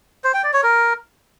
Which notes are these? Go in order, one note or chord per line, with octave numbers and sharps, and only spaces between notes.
C5
G5
D5
C#5
A#4